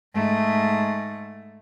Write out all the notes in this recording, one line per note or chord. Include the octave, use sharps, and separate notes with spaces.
G#2 A3